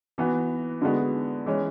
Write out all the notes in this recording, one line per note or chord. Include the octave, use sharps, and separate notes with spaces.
E3 B3 F#4
D3 G#3 B3 F#4
E3 G#3 C#4